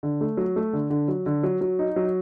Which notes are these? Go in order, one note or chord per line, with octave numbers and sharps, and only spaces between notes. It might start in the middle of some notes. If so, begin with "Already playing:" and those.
D3
A3
F#3
A3
D3
D3
F#3
D3
F#3
F#3
D#4
F#3